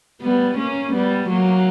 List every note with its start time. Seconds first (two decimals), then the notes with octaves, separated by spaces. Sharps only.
0.22 G3 B3
0.58 A#3 C#4
0.93 G3 B3
1.29 F#3 A#3